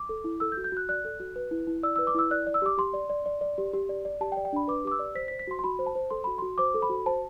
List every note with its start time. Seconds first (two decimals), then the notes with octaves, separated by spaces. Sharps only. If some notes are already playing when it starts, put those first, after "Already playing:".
Already playing: D6
0.09 A4
0.24 E4
0.40 A4 E6
0.52 G6
0.57 F#4
0.64 G6
0.72 F#4 F#6
0.89 D5 F#6
1.05 A4
1.20 F#4
1.36 B4
1.51 E4
1.67 E4
1.83 D5 E6
1.96 B4 E6
2.07 D6
2.15 E4 E6
2.31 D5 F#6
2.47 D5
2.54 E6
2.62 G4 D6
2.78 G4 C6
2.93 D5
3.10 D5
3.26 D5
3.41 D5
3.58 G4
3.73 G4
3.89 D5
4.05 D5
4.21 G4 A5
4.32 G5
4.37 D5
4.45 G5
4.53 D4 B5
4.68 B4 D6
4.85 G4 D6
4.91 E6
4.99 D5
5.15 C5 B6
5.28 B6
5.31 C5
5.39 B6
5.47 F#4 C6
5.59 C6
5.64 F#4 B5
5.79 C5
5.86 A5
5.95 C5
6.10 A4 C6
6.24 F#4 B5
6.38 F#4 C6
6.58 C5 D6
6.74 A4
6.82 B5
6.89 F#4
7.06 C5 A5